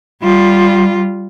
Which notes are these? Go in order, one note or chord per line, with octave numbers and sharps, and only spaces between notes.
G3 F4